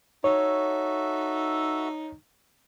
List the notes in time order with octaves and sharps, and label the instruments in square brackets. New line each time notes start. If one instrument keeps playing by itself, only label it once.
[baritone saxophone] D#4 [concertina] F#4 A4 E5 [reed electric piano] C#5